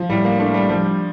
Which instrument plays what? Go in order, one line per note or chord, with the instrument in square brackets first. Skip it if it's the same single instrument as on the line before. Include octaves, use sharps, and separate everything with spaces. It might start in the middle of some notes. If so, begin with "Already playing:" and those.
Already playing: [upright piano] F3
[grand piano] A2 [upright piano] G3
[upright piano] A#3
[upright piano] A3 [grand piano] D4
[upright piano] G3
[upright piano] F3 [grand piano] G3